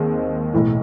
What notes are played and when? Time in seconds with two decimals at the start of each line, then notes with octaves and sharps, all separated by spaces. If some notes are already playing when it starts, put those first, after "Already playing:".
Already playing: D#2 D#3 G#3 C4
0.53 B1 A2 E3